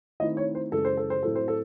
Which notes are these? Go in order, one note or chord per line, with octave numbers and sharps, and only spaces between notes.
D#3 A3 C4 E4 D#5
C#5
C5
F#2 C#3 E3 G#3 A4
C5
A4
C5
A2 F#3 C4 E4 A4
C5
A4